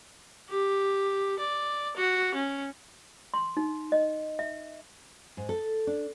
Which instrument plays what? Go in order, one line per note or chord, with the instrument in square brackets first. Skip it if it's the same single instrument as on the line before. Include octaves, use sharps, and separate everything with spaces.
[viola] G4
D5
F#4
C#4
[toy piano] C6
D#4
D#5
E5
[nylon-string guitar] G#2
A4
D4